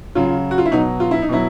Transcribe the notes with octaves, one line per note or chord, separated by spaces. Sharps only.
C#3 F#3 F4
F#4
F4
E4
B2 F#3 D#4
F4
E4
D#4
B2 F#3 E4